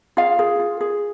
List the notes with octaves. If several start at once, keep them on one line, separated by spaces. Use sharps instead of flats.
F4 G#4 F5
G#4
F4
G#4